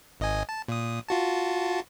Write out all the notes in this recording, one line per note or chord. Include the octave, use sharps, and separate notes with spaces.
G#1 D#5 G#5
A5
A#2 D#6
F4 F#4 A5